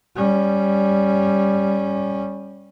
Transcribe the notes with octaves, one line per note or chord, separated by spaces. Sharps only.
G3 C#4